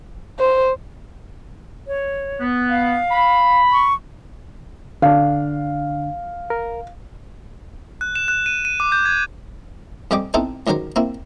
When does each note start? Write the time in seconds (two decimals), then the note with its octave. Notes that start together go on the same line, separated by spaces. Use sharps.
0.39 C5
1.87 C#5
2.40 B3
2.70 F5
3.12 B5
3.72 C#6
5.02 D3 D4 F5
6.50 A#4
8.01 F#6
8.15 E7
8.28 F#6
8.46 D#7
8.65 D#7
8.80 D6
8.92 G6
9.05 G#6
10.11 F2 G3 G#4 D#5 G5 D6
10.34 B3 C4 D#4 E4 A4 C5
10.67 C#2 D#3 F#3 A#4 C5
10.96 A#3 C4 E4